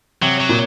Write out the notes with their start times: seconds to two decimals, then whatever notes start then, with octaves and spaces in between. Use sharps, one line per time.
0.22 C3 F#3
0.40 F#3
0.49 A#2